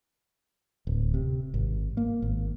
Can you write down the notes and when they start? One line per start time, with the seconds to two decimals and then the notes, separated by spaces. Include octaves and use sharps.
0.87 D1
1.14 C3
1.54 G#1
1.97 A#3
2.22 G#1